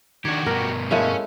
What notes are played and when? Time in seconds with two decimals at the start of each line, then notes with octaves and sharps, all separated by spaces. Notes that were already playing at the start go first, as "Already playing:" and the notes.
0.25 D#3 D4 F#4 G4 G#6
0.46 G2 B2 A#4
0.91 G#3 A3 C#4 E4 A#4 C#5 F5